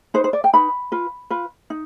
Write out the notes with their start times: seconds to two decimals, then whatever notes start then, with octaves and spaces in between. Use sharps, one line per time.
0.14 D#4 B4 C5
0.24 C5
0.33 D5
0.44 G5
0.53 D#4 B4 B5
0.92 F4 B4
1.30 F4 B4
1.70 D#4